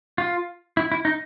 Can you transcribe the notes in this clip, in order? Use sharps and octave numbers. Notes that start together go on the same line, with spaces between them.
F4
E4
E4
D#4